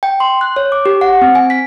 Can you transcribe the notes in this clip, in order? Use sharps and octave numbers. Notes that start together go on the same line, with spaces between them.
G5
C6
F#6
C#5
D6
G4
F#5
C4
G#5
B6